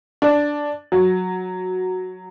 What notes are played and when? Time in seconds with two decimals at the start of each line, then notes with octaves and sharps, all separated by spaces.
0.22 D4
0.92 F#3